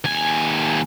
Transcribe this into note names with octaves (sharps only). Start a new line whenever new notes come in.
D#2 G#5